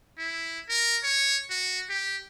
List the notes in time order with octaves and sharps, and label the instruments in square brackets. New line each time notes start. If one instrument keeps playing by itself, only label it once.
[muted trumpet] E4
A#4
C#5
F#4
G4